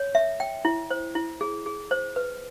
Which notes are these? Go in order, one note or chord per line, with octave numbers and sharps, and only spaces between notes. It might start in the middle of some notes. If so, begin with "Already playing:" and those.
Already playing: C#5
E5
G5
E4
C5
E4
G#4
G#4
C5
B4